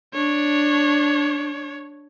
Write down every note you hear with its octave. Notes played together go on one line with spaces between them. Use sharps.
D4 C#5